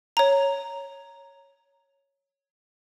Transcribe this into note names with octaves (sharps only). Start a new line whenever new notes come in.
C#5 A#5